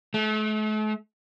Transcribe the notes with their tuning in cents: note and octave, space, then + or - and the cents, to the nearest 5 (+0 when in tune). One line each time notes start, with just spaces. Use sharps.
A3 -40